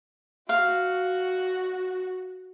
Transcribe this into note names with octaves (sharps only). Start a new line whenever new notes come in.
F#4 F5